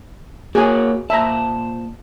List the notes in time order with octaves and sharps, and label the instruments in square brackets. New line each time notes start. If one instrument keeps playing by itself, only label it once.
[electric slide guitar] A#3 F#4 C#5 [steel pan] G#4 G#5
[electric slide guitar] A#2 C5 A5 [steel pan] E5 A#5